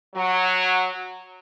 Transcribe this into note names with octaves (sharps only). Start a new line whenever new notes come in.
F#3